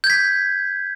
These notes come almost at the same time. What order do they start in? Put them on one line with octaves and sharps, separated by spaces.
G6 G#6 B6